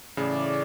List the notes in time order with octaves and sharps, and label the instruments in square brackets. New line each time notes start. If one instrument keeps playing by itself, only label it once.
[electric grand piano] A2 C#3 [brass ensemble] E3 A3 C#4 G#4 D5